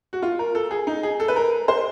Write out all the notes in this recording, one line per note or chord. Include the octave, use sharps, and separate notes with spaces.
F#4
F4
A#4
A4
G#4
D#4
G#4
A4
B4
A#4
C5